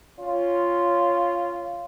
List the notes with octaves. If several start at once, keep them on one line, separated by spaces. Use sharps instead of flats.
C#4 F4